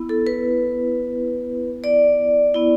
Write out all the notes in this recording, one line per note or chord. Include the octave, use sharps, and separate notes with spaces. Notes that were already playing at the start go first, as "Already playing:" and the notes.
Already playing: B3 E4
A4
B4
D5
B3 E4